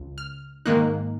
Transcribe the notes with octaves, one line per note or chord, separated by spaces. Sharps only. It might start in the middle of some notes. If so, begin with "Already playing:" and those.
Already playing: C#2
F6
G#2 D#3 A#3 D#4 F#6